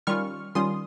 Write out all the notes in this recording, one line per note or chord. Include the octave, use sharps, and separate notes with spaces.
D#3 G3 C#4 F4 C#6 F6
D#3 G3 C#4 F4 C6 D#6